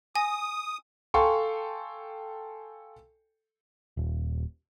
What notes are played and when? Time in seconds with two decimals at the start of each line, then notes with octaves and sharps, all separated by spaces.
0.16 G#5 D#6 A#6
1.14 A4 F5 G5 G#5 C6 C#6
3.97 D#1